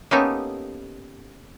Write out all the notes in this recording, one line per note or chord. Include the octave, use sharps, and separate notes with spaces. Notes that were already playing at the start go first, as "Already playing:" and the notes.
A#3 B3 C#4 D#4 G4 A4